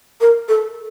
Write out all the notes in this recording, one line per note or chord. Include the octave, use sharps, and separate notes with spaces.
A#4
A4